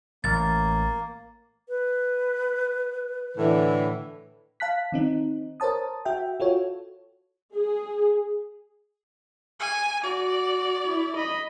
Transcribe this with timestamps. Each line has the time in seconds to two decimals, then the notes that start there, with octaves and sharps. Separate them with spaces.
0.24 A1 A#3 A6
1.69 B4
3.37 A2 D3 E3
4.60 F5 A5 F#6 B6
4.92 D#3 C4 D#4
5.60 A#4 C5 C#5 A5 D#6
6.05 F#4 E5 G5
6.40 F4 F#4 A4 C#5
7.56 G#4
9.60 G#5
10.03 F#4 D5
10.87 E4
11.17 D#5 B5